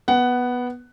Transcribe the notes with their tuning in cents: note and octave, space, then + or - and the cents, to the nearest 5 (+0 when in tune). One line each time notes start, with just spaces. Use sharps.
B3 -5 F#5 +10